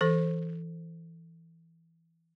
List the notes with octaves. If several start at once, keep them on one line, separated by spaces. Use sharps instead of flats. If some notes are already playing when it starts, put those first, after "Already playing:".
E3 A4 C5